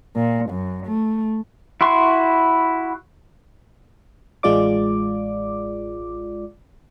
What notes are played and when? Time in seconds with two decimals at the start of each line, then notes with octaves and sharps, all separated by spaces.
0.16 A#2
0.50 F#2
0.86 A3
1.81 E4 F#4 C6 C#6
4.43 A1 G#3 F4 D5 D6